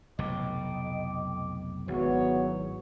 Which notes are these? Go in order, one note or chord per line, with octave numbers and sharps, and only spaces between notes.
F1 B1 A2 D#5 G5 D6
G#1 E2 F#3 B3 F#4 C#5